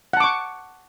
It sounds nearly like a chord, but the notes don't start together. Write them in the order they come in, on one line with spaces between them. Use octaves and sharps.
F#5 A5 D6 C#6